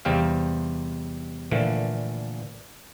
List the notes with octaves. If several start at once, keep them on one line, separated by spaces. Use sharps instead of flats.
E2 C3 G3 C4 C5 F5
A#2 D3 E3 F3 A3